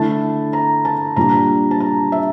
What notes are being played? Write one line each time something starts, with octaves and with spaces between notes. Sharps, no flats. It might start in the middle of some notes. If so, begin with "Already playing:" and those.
Already playing: D3 A3 E4 A5
A#5
A5
A#2 G3 D4 F4 A#5
A5
A#5
E5